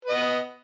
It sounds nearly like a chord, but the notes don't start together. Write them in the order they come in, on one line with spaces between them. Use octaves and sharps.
B4 D#5 B3